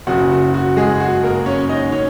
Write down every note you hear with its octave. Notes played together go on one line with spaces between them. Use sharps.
F#1 F#2 C#3 F#4
F#4
F#4
G#3 G#4
F#4
A#3 A#4
C#4 C#5
D#4 D#5
C#4 C#5